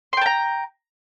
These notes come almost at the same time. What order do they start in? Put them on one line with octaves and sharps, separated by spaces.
C6 G5 A5 A#5